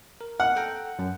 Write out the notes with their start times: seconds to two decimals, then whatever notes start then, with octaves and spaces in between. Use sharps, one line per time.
0.21 A#4
0.40 F#5
0.56 A4 G5 A#5
0.99 F#2